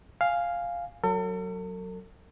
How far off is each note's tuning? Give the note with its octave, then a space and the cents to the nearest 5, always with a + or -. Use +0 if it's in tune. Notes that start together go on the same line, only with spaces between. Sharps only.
F5 +0 G#5 -5
F#3 +0 A4 +45